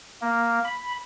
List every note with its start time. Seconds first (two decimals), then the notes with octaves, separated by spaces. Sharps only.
0.21 A#3
0.65 B5